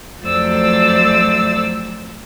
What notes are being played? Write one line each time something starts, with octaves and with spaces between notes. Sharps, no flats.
F2 F#3 A3 C5 D5 E6